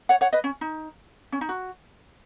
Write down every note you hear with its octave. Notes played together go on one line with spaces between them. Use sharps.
C#5 F#5
C#5 F#5
B4 D#5
C#4
D#4
C#4
D#4
F#4